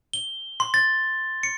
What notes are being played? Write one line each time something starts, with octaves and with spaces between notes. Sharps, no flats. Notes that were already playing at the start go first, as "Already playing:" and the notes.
G7
C6
A6
C#7